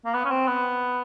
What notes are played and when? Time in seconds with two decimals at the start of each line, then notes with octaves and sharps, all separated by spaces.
0.05 A#3
0.14 B3
0.25 C#4
0.31 C4
0.47 B3